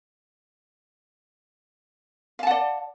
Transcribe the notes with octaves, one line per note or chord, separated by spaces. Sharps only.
D5 F5 F#5 A5